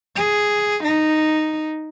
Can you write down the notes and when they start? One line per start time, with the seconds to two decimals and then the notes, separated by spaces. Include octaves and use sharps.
0.16 G#4
0.84 D#4